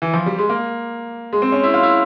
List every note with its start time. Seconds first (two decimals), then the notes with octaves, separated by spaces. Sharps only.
0.02 E3
0.14 F3
0.26 G3
0.38 G#3
0.49 A#3
1.33 G#3
1.42 C4
1.52 C#4
1.64 E4
1.74 F4
1.83 E4